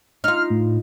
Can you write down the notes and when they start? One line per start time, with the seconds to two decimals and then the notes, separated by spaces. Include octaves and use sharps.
0.24 D#4 F4 F6
0.50 A2